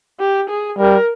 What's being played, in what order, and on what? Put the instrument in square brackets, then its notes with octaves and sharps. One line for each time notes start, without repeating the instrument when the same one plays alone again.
[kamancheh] G4
G#4
[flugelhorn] G3 [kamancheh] A#4